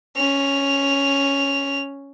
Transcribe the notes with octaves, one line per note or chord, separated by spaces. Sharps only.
C#4 F7